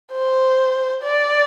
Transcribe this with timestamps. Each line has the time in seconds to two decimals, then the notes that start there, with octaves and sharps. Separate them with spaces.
0.12 C5
1.03 D5